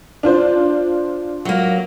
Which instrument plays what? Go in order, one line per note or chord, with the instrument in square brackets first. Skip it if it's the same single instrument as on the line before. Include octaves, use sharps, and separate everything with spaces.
[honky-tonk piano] D4 F4 C5
[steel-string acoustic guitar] F#3 A#3